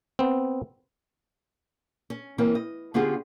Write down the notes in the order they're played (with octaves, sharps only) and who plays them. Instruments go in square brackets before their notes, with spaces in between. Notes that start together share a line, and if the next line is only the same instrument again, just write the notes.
[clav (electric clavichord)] B3 C4
[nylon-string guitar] C#4
E3 A#3 C4 C#4
D#5
D3 B3 C#4 F4 G4 G#4